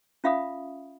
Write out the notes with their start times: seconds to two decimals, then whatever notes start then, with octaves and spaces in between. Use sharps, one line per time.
0.24 C#4 F4 E5 F5 B5 D#6